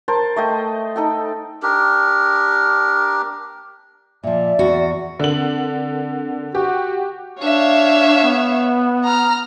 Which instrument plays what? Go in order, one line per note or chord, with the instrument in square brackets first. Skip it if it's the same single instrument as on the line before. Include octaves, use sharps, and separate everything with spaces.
[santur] A#4 C5 A5
A3 D#5 G5
D#4 A4 G5
[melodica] D4 G4 A#4
[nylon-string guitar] A#2 F3 [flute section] D5 E5
[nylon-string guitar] E2 [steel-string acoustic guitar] F#4
[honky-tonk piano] D3 F#7 [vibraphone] C4 A#4 F#5
[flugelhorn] F#4 [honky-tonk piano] G4 [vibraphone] F#5
[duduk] D4 [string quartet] C#5 E5 F5
[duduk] B3
[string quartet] A#5 F6